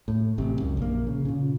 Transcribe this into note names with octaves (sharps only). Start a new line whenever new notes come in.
A2
A1 C3
C#2 F#2
A#1 A#3
C#3
A#2 C#3